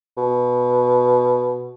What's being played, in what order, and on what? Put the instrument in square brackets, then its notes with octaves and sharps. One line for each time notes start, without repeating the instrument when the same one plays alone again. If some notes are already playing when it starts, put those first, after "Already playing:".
[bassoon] B2